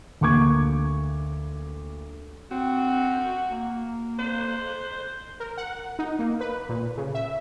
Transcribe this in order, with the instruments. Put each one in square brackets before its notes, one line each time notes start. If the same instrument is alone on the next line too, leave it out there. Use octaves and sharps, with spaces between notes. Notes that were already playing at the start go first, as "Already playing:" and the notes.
[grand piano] D2 A#3 C#6 D6 G#6
[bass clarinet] C4 [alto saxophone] F#4
[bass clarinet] A#3
[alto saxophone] C5
[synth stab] A#4
F#5
D#4
A#3
B4
A#2
C#3
E5